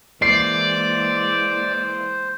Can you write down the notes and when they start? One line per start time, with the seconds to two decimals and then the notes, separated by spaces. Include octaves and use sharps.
0.22 E3 G#3 A#3 C5 D5 C7